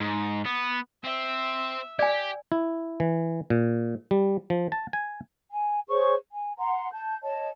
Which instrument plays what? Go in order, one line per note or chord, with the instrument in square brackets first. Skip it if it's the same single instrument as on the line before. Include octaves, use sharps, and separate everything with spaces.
[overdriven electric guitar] G#2
B3
[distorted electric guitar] C4 [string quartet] E5
[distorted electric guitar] G4 [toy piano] D5 G#5
[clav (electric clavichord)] E4
E3
A#2
G3
F3
A5
G#5
[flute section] G#5
G#4 C5 C#5 C#6
G#5
F#5 A#5 C6
A5 G6
C#5 D#5 A5